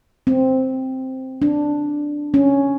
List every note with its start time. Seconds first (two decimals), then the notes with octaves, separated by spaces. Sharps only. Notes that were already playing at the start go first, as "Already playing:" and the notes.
0.27 C4
1.42 D4
2.34 C#4